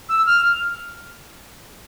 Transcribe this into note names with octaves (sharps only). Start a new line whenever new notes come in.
E6
F6